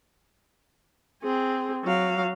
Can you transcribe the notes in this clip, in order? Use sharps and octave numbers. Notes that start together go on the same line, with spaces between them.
C4 G#4
F#3 F5